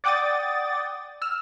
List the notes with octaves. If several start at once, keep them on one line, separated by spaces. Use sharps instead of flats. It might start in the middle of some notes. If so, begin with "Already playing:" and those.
D5 F#5 G5 D6 D#6 A6
E6 F6